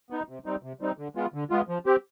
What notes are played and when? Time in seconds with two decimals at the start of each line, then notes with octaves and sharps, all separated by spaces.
0.10 B3 D#4
0.29 C3
0.46 G3 C4 D#4
0.63 C3
0.81 G3 C4 D#4
0.98 D3
1.16 G#3 B3 F4
1.34 D3
1.50 G#3 B3 F4
1.69 F3
1.86 C4 G4